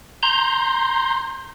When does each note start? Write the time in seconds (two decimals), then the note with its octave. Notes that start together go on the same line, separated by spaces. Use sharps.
0.23 A#5 C6 G6